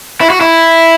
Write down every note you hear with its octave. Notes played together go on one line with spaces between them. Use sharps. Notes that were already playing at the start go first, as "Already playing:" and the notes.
E4
F#4
E4